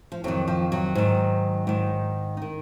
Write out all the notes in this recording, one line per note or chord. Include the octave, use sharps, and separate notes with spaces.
F3
F2 C3 D#3 F#3
F3
F#3
G#2 D#3
G#2 D#3
D#3 D#4